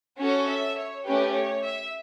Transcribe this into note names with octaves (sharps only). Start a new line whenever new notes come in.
C#4 F#4 A4 C#5
E5
C#5
A3 C#4 G4 B4
C#5
E5